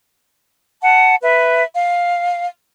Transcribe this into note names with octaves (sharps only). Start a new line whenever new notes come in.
F#5 A5
B4 E5
F5